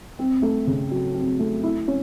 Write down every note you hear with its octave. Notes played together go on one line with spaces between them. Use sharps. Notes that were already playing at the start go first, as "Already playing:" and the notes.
C4
A3
C#3
F#3
C4
A3
E4
C#4